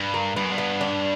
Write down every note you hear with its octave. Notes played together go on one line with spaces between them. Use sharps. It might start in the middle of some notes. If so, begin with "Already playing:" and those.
Already playing: G2
A#3
G2 B3
F#2
G2
B3
D4